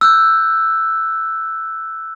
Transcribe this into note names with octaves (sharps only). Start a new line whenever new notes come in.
E6 F#6 G6